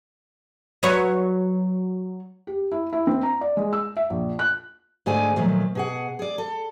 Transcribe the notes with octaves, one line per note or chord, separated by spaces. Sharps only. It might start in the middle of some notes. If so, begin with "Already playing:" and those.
F#3 B4 C#5
G4
E4
E4
C4
A#5
D5
G#3
E6
E5
A#1
F#6
G#2 D3 A3 G#4 D5 G#5
A#2 D#3 F3 F#3 A3
B2 G#4 F#5
G#4 D5
A4